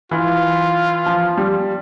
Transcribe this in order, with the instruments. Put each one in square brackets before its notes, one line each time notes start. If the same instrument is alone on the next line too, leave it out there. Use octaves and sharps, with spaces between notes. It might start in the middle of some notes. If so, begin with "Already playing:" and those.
[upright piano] E3 [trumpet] F4
[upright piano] F3
G3